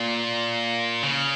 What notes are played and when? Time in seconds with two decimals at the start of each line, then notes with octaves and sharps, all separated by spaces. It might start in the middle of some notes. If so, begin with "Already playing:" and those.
Already playing: A#2
1.03 C#3